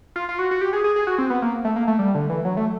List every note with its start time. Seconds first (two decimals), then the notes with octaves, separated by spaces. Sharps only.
0.16 F4
0.29 F4
0.39 F#4
0.51 F#4
0.61 G4
0.73 G#4
0.84 G#4
0.96 G#4
1.07 F#4
1.18 C4
1.30 B3
1.42 A#3
1.65 A3
1.76 A#3
1.88 A3
1.99 G3
2.15 D3
2.30 E3
2.45 F#3
2.57 A3